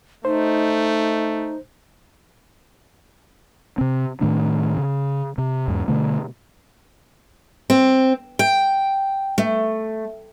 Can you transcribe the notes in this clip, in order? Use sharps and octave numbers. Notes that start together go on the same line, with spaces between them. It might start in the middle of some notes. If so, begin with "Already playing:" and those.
A3 D#4 C5
C3 C4
A2 D#3 A3 D4
C#3
C3
E2 G#2
B2 D3 A3
C4
G5
A3